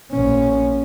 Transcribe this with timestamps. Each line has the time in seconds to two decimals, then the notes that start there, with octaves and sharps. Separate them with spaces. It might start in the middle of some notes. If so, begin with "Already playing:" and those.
0.12 A#1 C#4